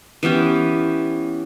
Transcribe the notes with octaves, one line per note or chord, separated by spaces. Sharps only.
E3 B3 C#4 G4